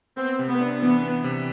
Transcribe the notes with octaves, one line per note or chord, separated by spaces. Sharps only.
B3 C4
C3
B3
D4
E3 B3
B3
C3